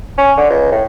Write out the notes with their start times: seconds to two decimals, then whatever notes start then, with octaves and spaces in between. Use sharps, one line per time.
0.18 C#4
0.38 D3
0.50 C#2
0.72 A2